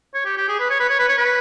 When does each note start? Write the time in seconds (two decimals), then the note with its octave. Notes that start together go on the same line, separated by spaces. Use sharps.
0.14 C#5
0.25 G4
0.37 G4
0.49 G#4
0.60 B4
0.70 C#5
0.80 B4
0.89 C#5
0.99 B4
1.09 C#5
1.18 B4